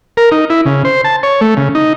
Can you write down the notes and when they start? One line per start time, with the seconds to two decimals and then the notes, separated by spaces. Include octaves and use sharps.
0.17 A#4
0.32 D#4
0.50 E4
0.66 C#3
0.85 C5
1.04 A5
1.23 C#5
1.41 A3
1.57 C#3
1.75 D#4